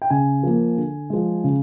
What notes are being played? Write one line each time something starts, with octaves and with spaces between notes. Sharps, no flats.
G5
C#3 G#5
F3 A#3
D3
F3 G#3
C#3